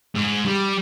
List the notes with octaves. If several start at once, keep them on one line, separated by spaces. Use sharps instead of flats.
G#2
G3